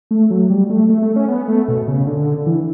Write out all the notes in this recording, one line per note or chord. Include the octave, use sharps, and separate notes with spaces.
A3
F#3
G3
A3
A3
A3
C#4
B3
A3
B2
C#3
D3
E3